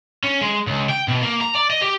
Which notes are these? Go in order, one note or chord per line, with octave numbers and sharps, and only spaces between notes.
C#4
G#3
C#2
G5
B2
A#3
A#5
D5
D#5
G4